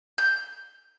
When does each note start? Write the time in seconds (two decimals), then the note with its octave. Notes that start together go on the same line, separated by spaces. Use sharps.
0.18 G6